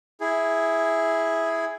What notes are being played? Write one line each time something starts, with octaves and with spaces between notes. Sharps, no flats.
E4 G#4